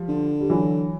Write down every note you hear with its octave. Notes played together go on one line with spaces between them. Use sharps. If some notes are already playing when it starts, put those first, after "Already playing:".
Already playing: F3 G3
D3
G3
E3 F#3